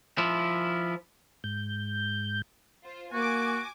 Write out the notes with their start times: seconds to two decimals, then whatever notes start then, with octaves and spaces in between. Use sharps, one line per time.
0.18 F3 E4
1.44 G#2 G6
2.84 F4 C5
3.13 A#3 F#4 G#5 D6